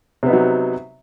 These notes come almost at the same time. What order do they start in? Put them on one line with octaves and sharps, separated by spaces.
C3 B3 D#4 F#3